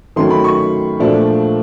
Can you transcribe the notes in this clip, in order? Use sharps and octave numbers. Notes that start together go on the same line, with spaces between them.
D#3 F#3 A3 C#4 C6
B5
C#6
A#2 F3 A3 D4